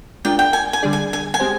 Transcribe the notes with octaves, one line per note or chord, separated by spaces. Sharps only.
G#3 D4 F4 A#4 D5 G5
G5
G#5
G#5
D3 G3 D4 G#4 D5
G#5
G#5
G#5
G#3 C4 G4 C5